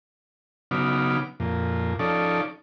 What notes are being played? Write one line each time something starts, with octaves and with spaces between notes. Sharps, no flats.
C#3 F#3 B3 D#4 D6 F6
F2 A#2
F3 C#4 D#4 A4 D5